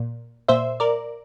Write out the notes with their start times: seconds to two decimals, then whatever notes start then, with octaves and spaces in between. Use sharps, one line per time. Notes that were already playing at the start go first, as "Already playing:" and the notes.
Already playing: A#2
0.48 A#2 C5 E5
0.80 A#4 D5